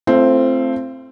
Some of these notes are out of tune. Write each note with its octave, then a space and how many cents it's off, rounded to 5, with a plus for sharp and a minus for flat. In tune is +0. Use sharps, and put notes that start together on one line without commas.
A3 +0 C4 +0 F4 -40